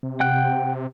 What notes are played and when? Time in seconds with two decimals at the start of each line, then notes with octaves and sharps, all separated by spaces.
0.03 C3
0.20 F#5 G5 F#6